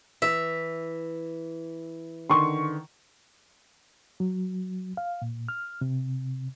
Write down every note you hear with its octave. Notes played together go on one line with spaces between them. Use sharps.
E3 E5
D3 D#3 C6 C#6
F#3
F5
A#2
F6
C3